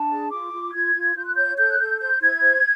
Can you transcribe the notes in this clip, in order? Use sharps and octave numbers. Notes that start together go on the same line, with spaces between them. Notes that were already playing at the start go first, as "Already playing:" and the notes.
Already playing: D4 A5
G#4
F4 D6
F4
F4 G#6
F4
F4 G6
F#6
C#5 G6
A4 G6
F#6
A4 G6
C5 G6
E4 G#6
C5